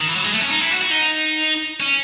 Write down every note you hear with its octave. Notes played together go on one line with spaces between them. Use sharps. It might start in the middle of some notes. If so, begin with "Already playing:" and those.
D#3
E3
F#3
G#3
A3
C#4
D#4
E4
F#4
F#4
D#4
C#4